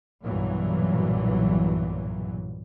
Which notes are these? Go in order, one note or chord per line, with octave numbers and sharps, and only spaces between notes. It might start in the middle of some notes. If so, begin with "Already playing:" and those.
B1 G2 A#2 E3 F#3